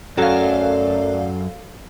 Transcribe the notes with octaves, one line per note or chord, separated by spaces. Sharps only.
F#2 F#3 A3 A4 A#4 D5 F5